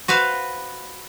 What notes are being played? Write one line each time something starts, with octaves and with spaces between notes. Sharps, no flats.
F#4 B4 C5 F5